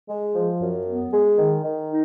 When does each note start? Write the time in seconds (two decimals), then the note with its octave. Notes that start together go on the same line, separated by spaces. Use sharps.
0.09 G#3
0.35 F3
0.61 F#2
0.87 B3
1.12 G#3
1.37 D#3
1.63 D#3
1.89 D#4